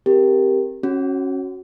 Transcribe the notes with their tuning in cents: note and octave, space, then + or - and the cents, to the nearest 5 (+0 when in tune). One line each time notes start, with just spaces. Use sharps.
C4 +0 G4 +0 A#4 +0
C#4 -20 F#4 +0